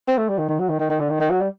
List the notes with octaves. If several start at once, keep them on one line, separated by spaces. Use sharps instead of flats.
C4
A3
G3
D#3
D#3
F#3
D#3
D#3
D#3
D3
D#3
D#3
F#3
G3